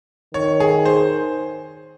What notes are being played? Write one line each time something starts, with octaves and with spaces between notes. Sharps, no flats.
D#3 C#5
G#4
C5